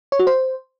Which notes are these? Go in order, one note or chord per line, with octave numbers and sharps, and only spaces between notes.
C#5
F#4
C5